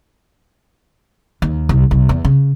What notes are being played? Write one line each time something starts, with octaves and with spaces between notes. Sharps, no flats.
D#2
C2
C2
E2
C#3